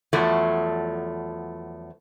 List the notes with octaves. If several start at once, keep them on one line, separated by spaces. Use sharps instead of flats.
E2 F3 F#3 A3